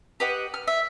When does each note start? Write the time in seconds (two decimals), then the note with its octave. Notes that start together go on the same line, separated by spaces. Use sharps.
0.20 G4 B4 D#5 F#5
0.54 F6
0.68 E5